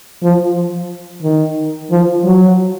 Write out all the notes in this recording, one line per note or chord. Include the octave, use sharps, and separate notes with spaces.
F3
D#3
F3
F#3